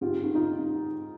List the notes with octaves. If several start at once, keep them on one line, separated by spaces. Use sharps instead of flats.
G#2 F4 G4
D#3
D#4 F4
D#3